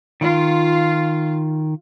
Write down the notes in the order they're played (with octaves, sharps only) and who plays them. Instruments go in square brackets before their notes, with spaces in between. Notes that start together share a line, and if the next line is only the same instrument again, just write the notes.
[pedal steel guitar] D#3 [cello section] F4